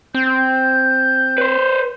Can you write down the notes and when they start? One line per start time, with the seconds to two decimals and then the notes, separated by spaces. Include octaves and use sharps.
0.15 C4 G6
1.38 B4 C5